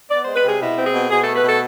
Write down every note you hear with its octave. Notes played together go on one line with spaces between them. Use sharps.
B3 D5
G#3 C5
B4
C3 G#4
B2 E4
C4
G#4
B2
B2 G#4
A3 A4
B4
B2 A4